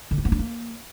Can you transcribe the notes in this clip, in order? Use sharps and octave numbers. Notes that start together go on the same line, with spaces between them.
D3
G#3
B3
D4
A#3